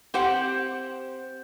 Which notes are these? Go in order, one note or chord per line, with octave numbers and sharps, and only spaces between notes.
C4 G4 C5 F#5